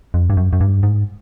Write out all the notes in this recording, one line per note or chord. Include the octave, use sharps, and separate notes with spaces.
F2
G2
F#2
F#2
G2
G#2